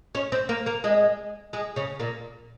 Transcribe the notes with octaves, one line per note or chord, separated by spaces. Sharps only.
C#4 C#5
C4 C5
A#3 A#4
A#3 A#4
G#3 G#4
G#3 G#4
C#3 C#4
A#2 A#3